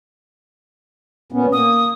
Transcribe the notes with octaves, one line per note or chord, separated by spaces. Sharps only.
A#2 B3 C#4
A#3 D#6